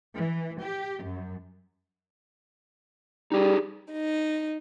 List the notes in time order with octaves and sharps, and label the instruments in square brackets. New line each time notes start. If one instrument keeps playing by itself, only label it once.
[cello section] E3
G4
F#2
[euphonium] G3 [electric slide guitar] D#4 G4 G#4
[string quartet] D#4